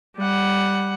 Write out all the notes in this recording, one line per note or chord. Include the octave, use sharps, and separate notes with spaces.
G3 F#5